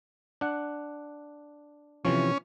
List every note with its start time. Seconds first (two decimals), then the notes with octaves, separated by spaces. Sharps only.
0.41 D4 F#5
2.05 C3 E3 F3 C#4